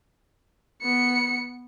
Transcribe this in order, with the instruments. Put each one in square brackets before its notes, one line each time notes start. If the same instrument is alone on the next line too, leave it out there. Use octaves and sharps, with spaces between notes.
[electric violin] B3 C#7